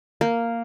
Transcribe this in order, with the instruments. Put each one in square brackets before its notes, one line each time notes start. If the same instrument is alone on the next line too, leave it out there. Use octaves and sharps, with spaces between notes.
[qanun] A#3